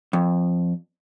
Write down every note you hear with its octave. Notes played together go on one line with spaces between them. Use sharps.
F2